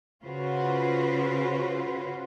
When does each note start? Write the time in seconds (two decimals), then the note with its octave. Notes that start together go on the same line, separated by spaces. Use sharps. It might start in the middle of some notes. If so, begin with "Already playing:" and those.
0.23 C#3 C#4 F4 F#4 B4 C5